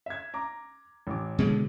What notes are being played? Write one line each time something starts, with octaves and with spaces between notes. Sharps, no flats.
E5 G#6
A#5 D6
A1 D6
B2 D3 G#3